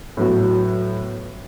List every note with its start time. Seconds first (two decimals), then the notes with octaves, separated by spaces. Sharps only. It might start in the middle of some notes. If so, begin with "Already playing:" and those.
0.17 A2 F#3 B3 F#4